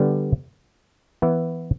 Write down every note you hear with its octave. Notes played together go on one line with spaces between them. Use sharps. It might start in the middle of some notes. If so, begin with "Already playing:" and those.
Already playing: D3 G3 B3
E3 B3 E4